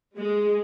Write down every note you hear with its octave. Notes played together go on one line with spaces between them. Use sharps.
G#3